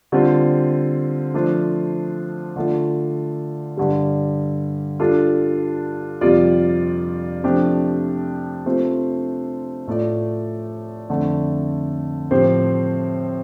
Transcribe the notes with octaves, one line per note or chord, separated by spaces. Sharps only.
D3 G3 C4 F4 C5
F3 A3 D4 F4 C5
D3 A3 F4 D5
G2 D3 G3
G3 D4 F4 A4
F2 C3 G3 F4 D5
C3 F3 A3 D4 G4
C3 A3 C4 F4 C5
A2 A3 F4 D5
F2 D3 A3
A2 F3 C4 G4 C5